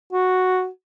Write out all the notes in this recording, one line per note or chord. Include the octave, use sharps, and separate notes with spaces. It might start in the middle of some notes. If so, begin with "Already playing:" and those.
F#4